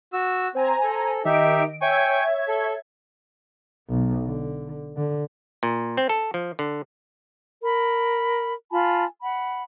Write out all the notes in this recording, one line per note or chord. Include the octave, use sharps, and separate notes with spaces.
F#4 E6
C4 C5 G#5 A#5
A4
D#3 D#4 G4 D#5 E5 D7
C#5 E5 G5 G#5 C#6 G#6
A4
B1
D3
D3
A#2
C4
A4
F3
D3
A#4 B5
F4 G#5 A5 B5
F#5 B5